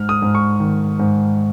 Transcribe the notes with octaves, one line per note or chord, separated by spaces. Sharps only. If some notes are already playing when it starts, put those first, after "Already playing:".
Already playing: G#2 F6
D#6
G#2
C#6
D#3
G#2